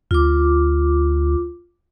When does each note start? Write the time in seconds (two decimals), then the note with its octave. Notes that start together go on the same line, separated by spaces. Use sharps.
0.11 D2 F4 D6